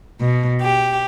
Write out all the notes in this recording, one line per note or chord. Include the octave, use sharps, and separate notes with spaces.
B2
G4